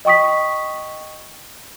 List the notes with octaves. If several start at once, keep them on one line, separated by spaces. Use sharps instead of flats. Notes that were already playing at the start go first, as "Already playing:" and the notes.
D#5 G5 C#6 D#6 B6